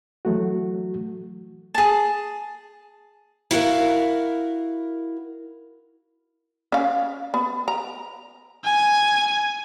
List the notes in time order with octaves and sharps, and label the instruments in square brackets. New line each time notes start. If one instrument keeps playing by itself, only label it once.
[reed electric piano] E3 F#3 A3 F#4
[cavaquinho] G#4 A5
[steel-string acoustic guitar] E4 F#4 A#4 F5
[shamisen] C#4 F5
B3
A#5
[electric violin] G#5